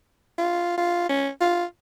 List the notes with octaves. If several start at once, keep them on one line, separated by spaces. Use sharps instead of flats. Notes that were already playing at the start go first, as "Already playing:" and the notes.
F4
F4
C#4
F4